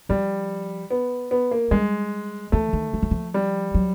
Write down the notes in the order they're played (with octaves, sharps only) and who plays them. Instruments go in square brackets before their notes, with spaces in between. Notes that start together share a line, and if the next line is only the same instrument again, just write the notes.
[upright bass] F3 [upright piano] G3
[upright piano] B3
B3
A#3
[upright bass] G3 [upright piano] G#3
[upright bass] E3 [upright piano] A3
[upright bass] D#3
F3
F#3
F3
[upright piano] G3
[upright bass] F#3